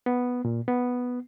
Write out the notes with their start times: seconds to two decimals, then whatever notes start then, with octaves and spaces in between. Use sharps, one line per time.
0.06 B3
0.45 A#2
0.68 B3